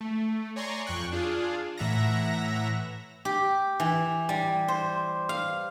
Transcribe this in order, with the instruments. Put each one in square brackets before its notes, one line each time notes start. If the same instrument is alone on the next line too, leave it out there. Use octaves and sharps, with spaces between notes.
[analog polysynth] A3
C#5 D5 G#5 A#5 C6 C#6
F2 G5 C#6 F#6
D4 F4 G#4
A2 E3 E5 F#5 A#5 A#6
[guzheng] G4
E3
G3
C5
F5